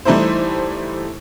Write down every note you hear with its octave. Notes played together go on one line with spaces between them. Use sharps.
E3 G3 A3 D#4 E4 C5